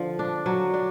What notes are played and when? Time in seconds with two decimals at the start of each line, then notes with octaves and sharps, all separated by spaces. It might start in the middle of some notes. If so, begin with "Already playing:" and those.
Already playing: D3 F3
0.19 D4
0.46 F#3
0.74 D4